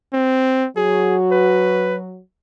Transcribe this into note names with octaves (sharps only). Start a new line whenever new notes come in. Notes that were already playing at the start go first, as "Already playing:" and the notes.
C4
F#3 F#4 G#4
B4